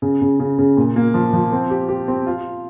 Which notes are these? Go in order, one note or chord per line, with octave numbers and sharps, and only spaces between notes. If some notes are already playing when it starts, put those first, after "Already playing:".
C#3
C#3
C#3
C#3
A#2
A#3
F3
F3
C4
G4
G4
C4
F4